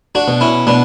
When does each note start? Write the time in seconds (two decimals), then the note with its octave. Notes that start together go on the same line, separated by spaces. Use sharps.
0.15 D4 F#4
0.28 B2
0.41 C#4 E4
0.67 B2 B3 D4